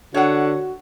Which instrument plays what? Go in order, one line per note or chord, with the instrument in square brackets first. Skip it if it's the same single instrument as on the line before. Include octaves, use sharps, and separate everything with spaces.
[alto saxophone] D3 [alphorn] F#4 [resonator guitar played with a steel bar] C#5 F#5